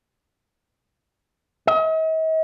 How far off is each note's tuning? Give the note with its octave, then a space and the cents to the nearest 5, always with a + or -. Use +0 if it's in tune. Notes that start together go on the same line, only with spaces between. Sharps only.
D#5 +45